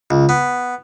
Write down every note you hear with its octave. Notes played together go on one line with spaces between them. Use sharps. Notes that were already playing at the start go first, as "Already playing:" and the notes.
C#2
B3